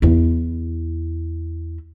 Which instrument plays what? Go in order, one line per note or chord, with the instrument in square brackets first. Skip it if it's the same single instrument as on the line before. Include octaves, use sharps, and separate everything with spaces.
[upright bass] E2 E4